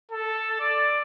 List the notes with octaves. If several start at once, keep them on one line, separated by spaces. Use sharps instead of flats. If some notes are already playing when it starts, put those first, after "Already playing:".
A4
D5